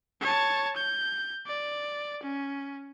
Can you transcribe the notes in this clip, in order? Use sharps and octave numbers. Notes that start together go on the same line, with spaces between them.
C#5 A5
G6
D5
C#4